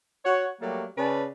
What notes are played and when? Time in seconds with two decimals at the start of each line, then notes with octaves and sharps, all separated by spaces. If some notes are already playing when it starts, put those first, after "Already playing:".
0.23 F#4 C#5
0.59 F#3 G3 A3 A#3
0.96 C#3 C#4 B4 D5 A5